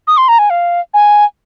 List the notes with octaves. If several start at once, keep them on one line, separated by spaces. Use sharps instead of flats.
D#6
C6
A#5
G#5
F5
G#5